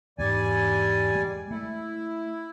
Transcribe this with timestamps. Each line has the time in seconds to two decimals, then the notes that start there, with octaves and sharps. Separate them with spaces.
0.19 E2 G#2 G3 D5 G#5
1.15 G#3
1.51 A3 E4